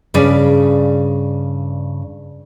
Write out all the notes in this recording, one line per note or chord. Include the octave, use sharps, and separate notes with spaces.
G2 C#3 G#4 B4 D5